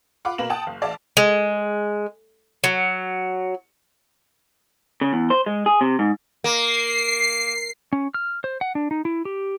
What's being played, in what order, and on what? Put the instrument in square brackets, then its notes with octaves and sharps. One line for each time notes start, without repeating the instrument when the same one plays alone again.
[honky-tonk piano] F4 F#5 B5 D6
B2 A#3 B4 E7 F#7
F#5 G5 A5 D#6
F#1 F5
A1 D5 E5 F5 A5
[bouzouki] G#3
F#3
[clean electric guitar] C#3
E2
C5
G#3
G#4
C3
G#2
[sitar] A#3 [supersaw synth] C7
[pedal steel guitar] C#4
F6
C5
F#5
D4
D#4
E4
G4